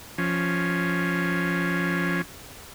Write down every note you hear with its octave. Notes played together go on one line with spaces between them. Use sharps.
F3 C#4